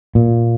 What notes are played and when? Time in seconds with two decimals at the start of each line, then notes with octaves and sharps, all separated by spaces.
0.15 A#2